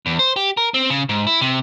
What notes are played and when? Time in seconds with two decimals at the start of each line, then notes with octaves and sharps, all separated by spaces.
0.06 E2
0.19 C5
0.36 G4
0.57 A#4
0.74 C4
0.90 C#3
1.09 G#2
1.27 E4
1.41 C3